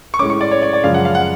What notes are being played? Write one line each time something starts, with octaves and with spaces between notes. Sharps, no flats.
C#6
A2 G#3 C#4 D6
C#6
D5
C#5
D5
D5
F#2 C#3 F3 G#3 C#4 F5
F#5
F5
F#5